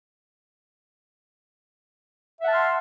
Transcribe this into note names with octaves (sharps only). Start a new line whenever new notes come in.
E5 F#5 A5 C6 F6